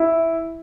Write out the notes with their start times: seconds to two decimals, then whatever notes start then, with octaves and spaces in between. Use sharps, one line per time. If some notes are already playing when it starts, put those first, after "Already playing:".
Already playing: E4